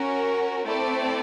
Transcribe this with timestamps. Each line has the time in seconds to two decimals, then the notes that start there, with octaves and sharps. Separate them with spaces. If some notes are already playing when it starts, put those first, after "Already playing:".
Already playing: C#4 F#4 A#4
0.64 A3 C4 E4 A4 D5